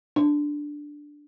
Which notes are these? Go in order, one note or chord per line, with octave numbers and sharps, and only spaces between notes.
D4